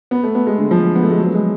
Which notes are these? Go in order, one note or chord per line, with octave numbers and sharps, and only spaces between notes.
B3
A3
B3
G#3
D3
F3
B3
A3
G#3
F#3
G#3